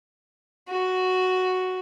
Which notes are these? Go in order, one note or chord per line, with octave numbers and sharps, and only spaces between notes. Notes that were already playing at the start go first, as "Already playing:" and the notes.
F#4